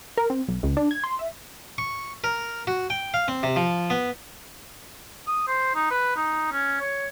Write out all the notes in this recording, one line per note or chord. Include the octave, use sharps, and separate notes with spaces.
A#4
C4
B1
C#2
D4
G#6
C6
E5
C#6
A#4
F#4
G5
F5
C4
C3
F3
B3
D#6
C5
D#4
B4
D#4
C#4
C#5